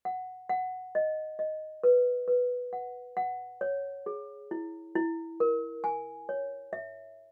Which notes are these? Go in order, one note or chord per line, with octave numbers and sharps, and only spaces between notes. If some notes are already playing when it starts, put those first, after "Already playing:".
F#5
F#5
D#5
D#5
B4
B4
F#5
F#5
C#5
G#4
E4
E4
A#4
G#5
C#5
E5